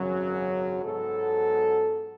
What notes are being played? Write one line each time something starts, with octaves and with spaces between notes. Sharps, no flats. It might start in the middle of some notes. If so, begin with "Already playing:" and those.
Already playing: G#1 F#2 C#3 F#3
G#2 F#3 B3 A4